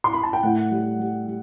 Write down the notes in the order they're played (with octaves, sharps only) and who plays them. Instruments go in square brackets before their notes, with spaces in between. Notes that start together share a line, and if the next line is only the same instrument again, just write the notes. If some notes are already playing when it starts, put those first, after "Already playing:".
[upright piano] C6
B5
A5
G5
A2 F#5
G3
G3
G3